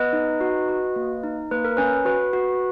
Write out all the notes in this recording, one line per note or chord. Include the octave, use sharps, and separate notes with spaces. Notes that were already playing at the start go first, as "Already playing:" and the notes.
Already playing: B3 B4 D#5
D#4
F#4
F#4
A#3
D#4
A#3 B4
A#4
C#4 B4
F#4 B4
F#4